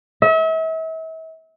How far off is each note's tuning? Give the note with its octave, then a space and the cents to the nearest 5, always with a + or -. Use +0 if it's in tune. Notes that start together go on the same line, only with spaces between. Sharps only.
E5 -40